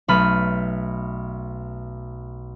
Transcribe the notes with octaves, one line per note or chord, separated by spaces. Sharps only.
B1 A3 A4 B5 F6 D#7